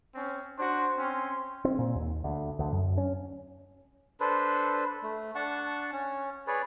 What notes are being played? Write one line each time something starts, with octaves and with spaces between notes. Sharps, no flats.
C4 C#4
D4 F#4 C5
C4 C#4 C6
C4
A#2
D#2
D2
D2
F#2
C#4
D4 A4 B4 C5
A3
D4 F#5 A5 C#6
C#4
G#4 B4 C#5 D5